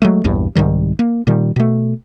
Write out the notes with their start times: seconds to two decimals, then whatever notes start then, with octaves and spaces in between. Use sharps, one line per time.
0.02 F#3 G#3 A3
0.24 A#1 E2 G2
0.55 C2 G#2 D#3 G3
0.99 A#3
1.27 A#2 D#3 G3
1.56 B2 A3